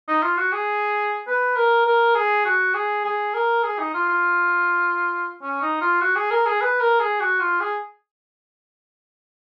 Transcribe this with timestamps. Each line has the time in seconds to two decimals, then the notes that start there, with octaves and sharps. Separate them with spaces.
0.08 D#4
0.23 F4
0.37 F#4
0.52 G#4
1.27 B4
1.56 A#4
1.85 A#4
2.15 G#4
2.45 F#4
2.74 G#4
3.05 G#4
3.34 A#4
3.63 G#4
3.79 D#4
3.94 F4
4.09 F4
5.42 C#4
5.62 D#4
5.81 F4
6.01 F#4
6.16 G#4
6.31 A#4
6.46 G#4
6.61 B4
6.81 A#4
7.00 G#4
7.20 F#4
7.40 F4
7.60 G#4